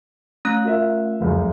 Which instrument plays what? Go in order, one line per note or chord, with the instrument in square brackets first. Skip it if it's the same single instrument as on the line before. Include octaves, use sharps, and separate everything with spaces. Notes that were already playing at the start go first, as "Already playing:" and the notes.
[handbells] A3 C#4 F#6
[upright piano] F4 A#4 E5
F1 C#2 F#2